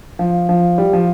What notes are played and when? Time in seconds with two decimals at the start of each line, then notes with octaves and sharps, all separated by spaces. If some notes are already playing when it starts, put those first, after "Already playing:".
0.19 F3
0.49 F3
0.78 G3
0.93 F3